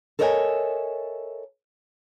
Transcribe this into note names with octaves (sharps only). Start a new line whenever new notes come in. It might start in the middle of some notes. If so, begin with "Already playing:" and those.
A4 A#4 C#5 D#5 E5 G#5